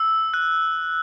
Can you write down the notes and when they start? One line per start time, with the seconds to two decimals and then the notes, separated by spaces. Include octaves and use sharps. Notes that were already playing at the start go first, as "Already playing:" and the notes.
Already playing: E6
0.34 F#6